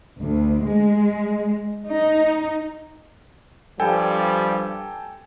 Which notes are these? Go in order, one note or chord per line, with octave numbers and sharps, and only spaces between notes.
D2
G#3
D#4
G2 F3 G3 A4 G5 G#5